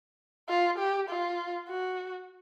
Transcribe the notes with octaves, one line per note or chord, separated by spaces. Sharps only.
F4
G4
F4
F#4